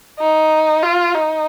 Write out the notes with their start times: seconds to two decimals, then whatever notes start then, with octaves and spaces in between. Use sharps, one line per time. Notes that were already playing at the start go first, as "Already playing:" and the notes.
0.19 D#4
0.82 F4
1.15 D#4